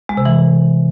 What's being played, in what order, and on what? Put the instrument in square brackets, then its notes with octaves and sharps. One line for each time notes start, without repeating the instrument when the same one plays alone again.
[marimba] G#3
C3
E3